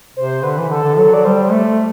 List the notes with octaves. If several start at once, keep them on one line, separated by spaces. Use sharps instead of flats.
C3 C5
D3 B4
E3
D3 A4
D3
F#3 A4
D5
G3 C5
A3